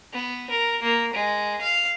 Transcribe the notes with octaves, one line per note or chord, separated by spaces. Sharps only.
B3
A#4
A#3
G#3
F5